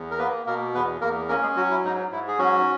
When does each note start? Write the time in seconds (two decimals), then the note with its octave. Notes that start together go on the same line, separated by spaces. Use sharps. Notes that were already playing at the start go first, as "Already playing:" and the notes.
Already playing: E2
0.11 A#4
0.19 A#3 B3 B4
0.46 B2 A#3 A#4
0.74 E2 B3 B4
1.01 E2 A#3 A#4
1.29 A#3 C#4 A#4
1.42 G#3 G#4
1.56 F#3 F#4
1.71 E4
1.84 G#2 D#4
2.11 G#2 E4
2.28 G#4
2.39 F#3 C#4 F#4